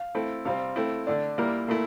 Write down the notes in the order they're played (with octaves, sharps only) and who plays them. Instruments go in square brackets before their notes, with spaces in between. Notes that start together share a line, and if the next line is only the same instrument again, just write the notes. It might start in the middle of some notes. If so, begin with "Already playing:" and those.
Already playing: [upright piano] F5
[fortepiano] A3 C4 E4 A4
[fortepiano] C3 G3 C4 [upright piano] F5
[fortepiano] A3 C4 E4
[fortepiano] D3 A3 D4 [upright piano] D5
[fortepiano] A#2 G3 A#3 E4 A#4
[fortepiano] A#2 A3 E4 [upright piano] A#4